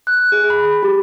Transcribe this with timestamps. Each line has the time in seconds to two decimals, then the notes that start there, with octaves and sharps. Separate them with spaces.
0.07 F#6
0.32 G#4
0.50 B5
0.83 G4